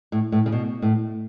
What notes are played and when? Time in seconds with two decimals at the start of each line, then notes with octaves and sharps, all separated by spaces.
0.12 A2
0.32 A2
0.46 C#3
0.52 B2
0.82 A2